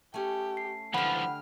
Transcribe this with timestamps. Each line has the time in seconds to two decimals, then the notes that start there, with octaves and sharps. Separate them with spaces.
0.14 A3 C#4 G4
0.57 C7
0.94 D3 E3 F3 G4 F#5 B5 F6